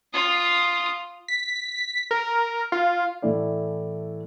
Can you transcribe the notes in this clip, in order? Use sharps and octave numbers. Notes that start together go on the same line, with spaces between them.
F4 D#6
B6
A#4
F4
A2 E3 A3 E4 D5